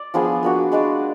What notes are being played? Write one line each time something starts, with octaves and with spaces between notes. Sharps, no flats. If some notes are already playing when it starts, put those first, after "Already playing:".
Already playing: D5
F3 B3 D4 G#4
A#3 D4 F#4
G#3 D4 F#4 D5